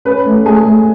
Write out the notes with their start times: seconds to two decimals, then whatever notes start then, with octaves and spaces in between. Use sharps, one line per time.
0.05 C#4 B4
0.25 A3
0.45 A3 G#4 G#5
0.65 A3